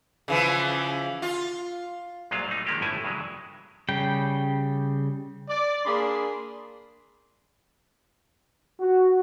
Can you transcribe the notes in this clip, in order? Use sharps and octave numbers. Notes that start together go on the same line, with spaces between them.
C#3 E3 F3
F4
C2 A#2 F#3 G#3 F4 F5
G3 A3 D#4
D#3 F3 G#3 A#3 D4 G4
G1 A2 A3 E4 G#5
G2 C#3 E3 F#3 G#3
C#3 G3 G5
D5
A#3 D4 G#4 B5 C6
F#4